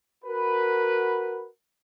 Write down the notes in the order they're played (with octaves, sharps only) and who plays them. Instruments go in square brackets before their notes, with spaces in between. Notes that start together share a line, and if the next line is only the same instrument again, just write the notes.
[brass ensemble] F#4 A#4 B4